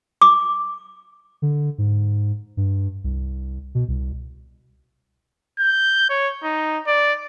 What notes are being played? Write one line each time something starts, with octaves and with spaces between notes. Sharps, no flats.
D6
D3
G#2
G2
C2
B2
C2
G6
C#5
D#4
D5